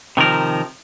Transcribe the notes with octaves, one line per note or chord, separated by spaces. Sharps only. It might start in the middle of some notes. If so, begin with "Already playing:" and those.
C3 D#3 F3 A#4